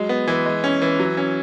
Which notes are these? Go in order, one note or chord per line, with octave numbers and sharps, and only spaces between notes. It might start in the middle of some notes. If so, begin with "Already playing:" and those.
Already playing: F#3 G#3
B3
E3
G#3
C#4
E3
F#3
C#4